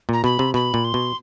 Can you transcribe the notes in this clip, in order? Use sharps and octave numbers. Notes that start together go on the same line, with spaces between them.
A#2 A#5
B2 B5
C3
B2 B5
A#2
C6
B2